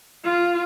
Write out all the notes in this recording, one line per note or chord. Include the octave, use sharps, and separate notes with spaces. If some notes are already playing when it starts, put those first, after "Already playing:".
F4